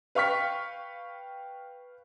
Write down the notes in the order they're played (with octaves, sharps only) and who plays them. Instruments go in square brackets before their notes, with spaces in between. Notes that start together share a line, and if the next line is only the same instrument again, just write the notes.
[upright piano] B4 F5 G5 C#6 F6 B6